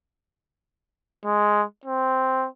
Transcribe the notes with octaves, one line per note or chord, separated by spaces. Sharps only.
G#3
C4